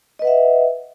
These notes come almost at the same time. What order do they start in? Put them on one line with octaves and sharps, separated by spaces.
D#5 B4 F#5 E5